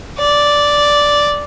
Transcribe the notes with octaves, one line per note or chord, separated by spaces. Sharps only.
D5